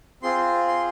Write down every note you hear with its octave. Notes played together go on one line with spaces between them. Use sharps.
C4 F4 G#4 C6
C6